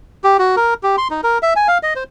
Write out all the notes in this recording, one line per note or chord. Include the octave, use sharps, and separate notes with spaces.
G4
F#4
A#4
G4
C6
D#4
A#4
E5
G#5
F5
D#5
C5